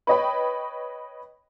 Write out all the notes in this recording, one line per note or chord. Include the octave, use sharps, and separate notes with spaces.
B4 C#5 D#5 G5 B5